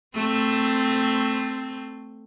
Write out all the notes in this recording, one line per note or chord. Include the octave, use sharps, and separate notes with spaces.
A3 C4